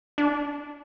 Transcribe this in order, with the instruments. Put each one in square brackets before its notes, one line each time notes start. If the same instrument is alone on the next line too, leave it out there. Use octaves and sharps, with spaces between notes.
[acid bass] D4